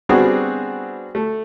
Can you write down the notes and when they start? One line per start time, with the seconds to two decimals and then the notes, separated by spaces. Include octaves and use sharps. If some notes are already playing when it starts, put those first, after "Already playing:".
0.09 G3 B3 C4 D4 F#4 G#4
1.15 A3